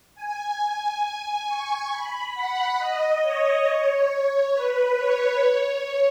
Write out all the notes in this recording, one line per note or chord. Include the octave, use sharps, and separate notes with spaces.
G#5
C#6
B5
F#5
D#5
C#5
B4
C#5
C#5